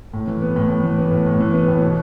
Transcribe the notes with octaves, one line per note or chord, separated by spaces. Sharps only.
A2
E3
B3
A2
A2
E3
B3
A2
A2
E3
B3
A2
B2